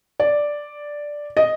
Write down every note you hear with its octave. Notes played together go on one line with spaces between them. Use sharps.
D5
D#5